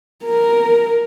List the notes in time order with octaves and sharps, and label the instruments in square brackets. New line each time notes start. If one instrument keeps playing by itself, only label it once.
[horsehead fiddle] A#4